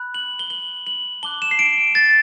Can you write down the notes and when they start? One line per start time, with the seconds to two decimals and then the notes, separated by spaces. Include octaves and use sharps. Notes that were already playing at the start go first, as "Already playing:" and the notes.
Already playing: B5 F#6
0.14 F#7
0.39 G7
0.50 F#7
0.87 F#7
1.23 A5 D6 F#6 G7
1.42 E7
1.51 C7
1.59 D7
1.95 A6